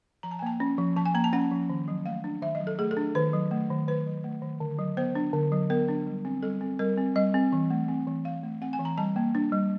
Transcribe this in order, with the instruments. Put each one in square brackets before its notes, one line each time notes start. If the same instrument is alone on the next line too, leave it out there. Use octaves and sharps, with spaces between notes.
[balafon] F3 A#5
A5
G#5
A#3 A5
C#4
F3
F3 A5
G#5
A#3 A#5
A5
C#4 F#5
F3
D#3
F#3
A3 F5
D4
D#3 E5
D#5
F#3
A4
A3 G#4
A4
D4
D#3 B4
F#3
A3
D#3
D#3 B4
F#3
A3
D#3
D3
F#3
B3 C5
D4
D3
F#3
B3 A#4
D4
G3
C4
G3 A4
C4
G3 A#4
C4
G3 D#5
C4
E3
A3
C4
E3
E3 F5
A3
C4 F#5
G#5
E3
A#5
G3 A5
A#3
D4
G3